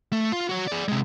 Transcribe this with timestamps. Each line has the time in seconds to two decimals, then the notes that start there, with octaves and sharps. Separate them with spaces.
0.12 A3
0.32 F4
0.49 F#4 C#5
0.67 G#4 D5
0.89 C3 G#3